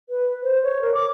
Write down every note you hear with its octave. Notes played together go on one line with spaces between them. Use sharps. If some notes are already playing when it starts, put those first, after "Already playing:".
B4
C5
C#5
A#4
D6